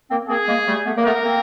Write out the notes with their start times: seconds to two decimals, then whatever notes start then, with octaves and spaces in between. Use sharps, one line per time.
0.10 A#3 C4
0.29 A#3 C4 G#4
0.48 G#3 A#3
0.68 G3 A3
0.86 A3 B3
0.97 A#3
1.05 A3 B3 A#4
1.24 A#3 C4